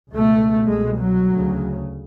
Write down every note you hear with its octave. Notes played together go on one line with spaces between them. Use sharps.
C#2 B2 A3
C2 G#3
B2
F#3
D2 C#3